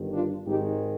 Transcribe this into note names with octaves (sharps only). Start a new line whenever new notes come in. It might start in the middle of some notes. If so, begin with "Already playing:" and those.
Already playing: G1 G2 D#3
D4 F4
G#1 G#2 D#3 G#3 D#4 G4